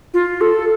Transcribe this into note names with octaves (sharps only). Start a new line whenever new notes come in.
F4
A4